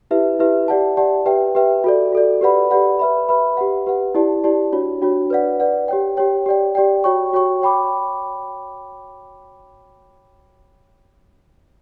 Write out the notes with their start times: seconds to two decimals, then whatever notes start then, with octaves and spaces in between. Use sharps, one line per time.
0.11 E4 G4 B4 E5
0.39 E4 G4 B4 E5
0.68 G4 D5 F#5 A5
0.97 G4 D5 F#5 A5
1.26 G4 B4 E5 G5
1.55 G4 B4 E5 G5
1.84 F#4 A4 D5
2.13 F#4 A4 D5
2.41 G4 B4 D5 F#5 B5
2.70 G4 B4 D5 F#5 B5
2.99 B4 E5 B5
3.29 B4 E5 B5
3.57 G4 B4 F#5
3.87 G4 B4 F#5
4.15 E4 G4 D5 A5
4.44 E4 G4 D5 A5
4.72 D4 F#4 C#5
5.02 D4 F#4 C#5
5.30 B4 D5 F#5
5.60 B4 D5 F#5
5.88 G4 C#5 G5
6.17 G4 C#5 G5
6.46 G4 D5 G5
6.75 G4 D5 G5
7.04 F#4 C#5 G5 C#6
7.33 F#4 C#5 G5 C#6
7.62 C#5 G5 B5 D6